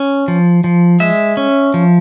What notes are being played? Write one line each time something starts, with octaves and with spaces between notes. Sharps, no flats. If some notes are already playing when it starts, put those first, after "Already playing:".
Already playing: C#4
F3
F3
G#3 E5
C#4
F3